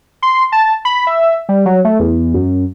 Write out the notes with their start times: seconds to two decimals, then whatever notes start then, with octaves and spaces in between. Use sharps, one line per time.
0.22 C6
0.52 A5
0.85 B5
1.07 E5
1.49 G3
1.66 F#3
1.84 A3
1.99 E2
2.34 F#2